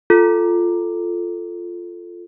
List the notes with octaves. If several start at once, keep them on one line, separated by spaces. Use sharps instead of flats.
F4 A4